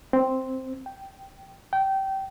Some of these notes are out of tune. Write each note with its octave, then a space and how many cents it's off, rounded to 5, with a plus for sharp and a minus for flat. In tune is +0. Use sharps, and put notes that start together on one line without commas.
C4 +0
G5 -5
G5 -20